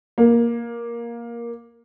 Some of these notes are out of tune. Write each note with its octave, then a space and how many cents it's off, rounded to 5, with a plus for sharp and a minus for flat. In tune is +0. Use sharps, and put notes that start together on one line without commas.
A#3 +10